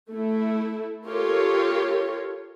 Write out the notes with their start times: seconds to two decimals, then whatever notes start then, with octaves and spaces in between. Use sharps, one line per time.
0.10 A3 E4
1.06 F4 G4 A4 A#4 C#5